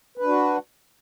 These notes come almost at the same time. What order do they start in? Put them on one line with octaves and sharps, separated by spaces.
B4 D4 F#4